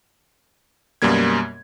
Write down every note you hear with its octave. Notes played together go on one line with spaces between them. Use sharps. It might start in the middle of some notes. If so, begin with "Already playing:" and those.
F#2 B2 G3 A#3 G#6